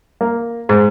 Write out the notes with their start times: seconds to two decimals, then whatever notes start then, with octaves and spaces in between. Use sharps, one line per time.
0.21 A#3
0.69 G#2